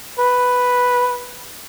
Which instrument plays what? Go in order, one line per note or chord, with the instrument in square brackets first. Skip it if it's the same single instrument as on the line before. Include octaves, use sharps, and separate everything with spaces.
[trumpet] B4